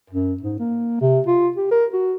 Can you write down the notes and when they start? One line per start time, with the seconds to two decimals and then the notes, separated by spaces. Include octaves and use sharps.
0.10 F#2
0.42 G#2
0.59 A#3
1.01 C3
1.26 F4
1.56 G4
1.71 A#4
1.93 F#4